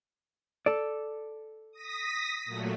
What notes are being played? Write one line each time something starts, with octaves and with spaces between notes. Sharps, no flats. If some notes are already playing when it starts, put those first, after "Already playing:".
A4 D5
D#6 A#6 B6
A#2 F#3 A3